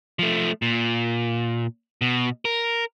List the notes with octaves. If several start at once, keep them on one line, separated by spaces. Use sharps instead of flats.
F3 A3
A#2
B2
A#4